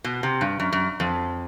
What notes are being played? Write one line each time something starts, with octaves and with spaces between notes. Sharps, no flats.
B2
C3
G2
F#2
F#2
F2